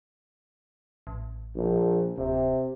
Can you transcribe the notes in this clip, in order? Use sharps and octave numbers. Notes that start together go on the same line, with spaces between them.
A1
A#1
D1 C3